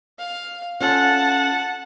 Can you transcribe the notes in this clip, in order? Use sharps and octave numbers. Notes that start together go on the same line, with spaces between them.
F5
C#4 F4 A4 F#5 A5